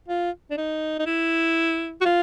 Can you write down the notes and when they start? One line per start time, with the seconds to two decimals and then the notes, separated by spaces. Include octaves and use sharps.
0.08 F4
0.51 D4
0.57 D#4
0.99 D#4
1.06 E4
2.01 F#4
2.05 F4